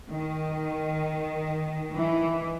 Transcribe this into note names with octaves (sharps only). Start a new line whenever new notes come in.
D#3
E3